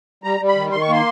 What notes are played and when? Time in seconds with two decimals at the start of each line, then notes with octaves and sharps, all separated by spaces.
0.24 G3 A#5
0.40 G3
0.48 B5
0.55 D#3
0.72 D#3 C6
0.82 C#6
0.88 A#3 C6